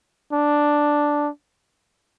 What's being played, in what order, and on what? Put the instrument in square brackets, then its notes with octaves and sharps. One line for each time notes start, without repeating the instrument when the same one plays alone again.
[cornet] D4